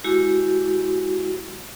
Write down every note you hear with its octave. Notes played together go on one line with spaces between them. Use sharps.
G#3 E4 F#4 G4